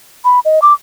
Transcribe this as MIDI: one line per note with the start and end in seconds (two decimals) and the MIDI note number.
0.25 0.40 83
0.45 0.60 75
0.62 0.73 86